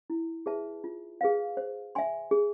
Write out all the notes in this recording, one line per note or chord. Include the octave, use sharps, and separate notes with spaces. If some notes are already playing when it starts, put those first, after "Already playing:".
E4
G#4 B4 E5 A5
F4
G#4 B4 F5
C5
E5 G#5 C6
G#4